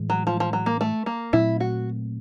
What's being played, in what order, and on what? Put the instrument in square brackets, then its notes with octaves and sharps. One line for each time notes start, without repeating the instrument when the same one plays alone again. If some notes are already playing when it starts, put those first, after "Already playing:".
Already playing: [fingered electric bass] A2 E3 G#3
[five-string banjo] F#3
F3
F3
F#3
A#3
A3
A#3
[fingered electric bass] A#2 F#3 A3 C4 [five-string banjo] E4
[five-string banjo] F#4